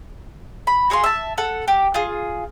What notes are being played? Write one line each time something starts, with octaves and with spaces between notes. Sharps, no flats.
B5
F#4 G#4 F5 C6
E5 A5
A4 F#5
G4
F4 G#4